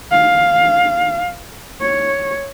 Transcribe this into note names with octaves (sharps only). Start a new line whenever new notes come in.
F5
C#5